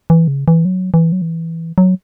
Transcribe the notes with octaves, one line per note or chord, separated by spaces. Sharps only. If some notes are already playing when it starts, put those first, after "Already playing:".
E3
C#3
E3
F#3
E3
F#3
E3
F#3